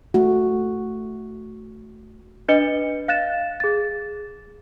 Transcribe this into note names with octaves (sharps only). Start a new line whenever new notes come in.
A3 F#4
D4 B4 D#5 C#7 G7
F5 F#6 A6 E7
G#4 A6